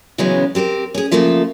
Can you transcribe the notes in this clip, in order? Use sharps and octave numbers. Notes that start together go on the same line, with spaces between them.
C#3 E3 F#3 G#3 B3 C#4
C4 G4 A4 A#4
C#4 G#4
C#3 F3 A3 A#3 F4 E5